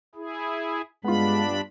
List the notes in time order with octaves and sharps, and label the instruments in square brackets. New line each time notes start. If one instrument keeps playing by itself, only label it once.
[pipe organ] E4 G#4
[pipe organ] G2 D4 B5 [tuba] G#3 [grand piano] B3 F4